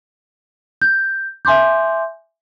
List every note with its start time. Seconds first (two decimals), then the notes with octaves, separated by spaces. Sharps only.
0.82 G6
1.45 E5 G#5 C6 D6 G6